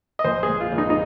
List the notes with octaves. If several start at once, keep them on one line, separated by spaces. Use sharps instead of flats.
D#5
A#1 C5
G#4
G#3
F4
A#1
D#4
D#4